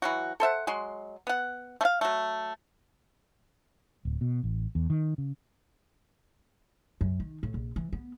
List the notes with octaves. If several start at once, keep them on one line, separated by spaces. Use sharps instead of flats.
E3 F#3 F#4
A4 C5 E5 F#5
F#3 G#3 C6
B3 F#5
A3 F5
F#3 A3
D1
B2
A1
E2
D#3
C#3
F#2
D#3
A2
A#1
E3
B3